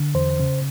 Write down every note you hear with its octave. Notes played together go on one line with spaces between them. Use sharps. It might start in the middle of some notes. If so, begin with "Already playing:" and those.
Already playing: D3
E2 C5
C#3